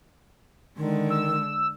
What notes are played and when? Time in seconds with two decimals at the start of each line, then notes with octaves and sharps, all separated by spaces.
0.77 D3 D#3 G#3
1.10 E6